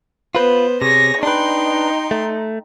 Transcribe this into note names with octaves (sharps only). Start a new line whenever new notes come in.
B3 F4 B4 C5
C3 G#4 C#5 A#6
D4 D#4 B4 G5 C6
A3